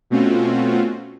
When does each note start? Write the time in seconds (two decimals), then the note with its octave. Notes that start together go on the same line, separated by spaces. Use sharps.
0.10 B2 A3 C4 C#4 F4 F#4